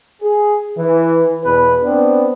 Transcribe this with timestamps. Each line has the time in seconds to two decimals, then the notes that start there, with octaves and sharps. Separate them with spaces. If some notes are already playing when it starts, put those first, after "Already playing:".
0.21 G#4
0.77 E3
1.44 E2 B2 B4
1.83 B3 C4 D4